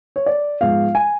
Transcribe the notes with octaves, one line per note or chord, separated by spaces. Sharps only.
C#5
D5
G#2 F3 G#3 B3 F4 F5
G#5